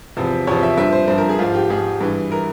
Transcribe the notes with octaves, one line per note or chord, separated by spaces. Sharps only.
E2 C3 F3
E2 C3 F3 C#5
E5
G2 F3 E5
C5
G2 F3 C5
A#4
G#4
G#2 F3 F4
G4
G#2 F3 G#4
G2 E3
E3 A#4